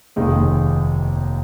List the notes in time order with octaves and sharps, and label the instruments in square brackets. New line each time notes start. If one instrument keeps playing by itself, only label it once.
[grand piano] F1 D#2 D#3 G#3 D#4